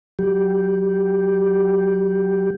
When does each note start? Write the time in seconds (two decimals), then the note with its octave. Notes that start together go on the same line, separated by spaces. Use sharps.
0.19 F#3 G4